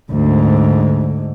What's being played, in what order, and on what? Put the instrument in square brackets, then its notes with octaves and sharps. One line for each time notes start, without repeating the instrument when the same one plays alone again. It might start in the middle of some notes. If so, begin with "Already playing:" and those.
[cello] D2 [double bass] G#2 D3